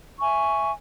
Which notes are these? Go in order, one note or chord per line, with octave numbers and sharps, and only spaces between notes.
E5 G#5 C#6